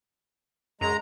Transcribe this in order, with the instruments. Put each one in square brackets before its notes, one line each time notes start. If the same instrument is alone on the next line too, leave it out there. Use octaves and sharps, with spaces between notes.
[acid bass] F#2 [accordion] G#3 A#5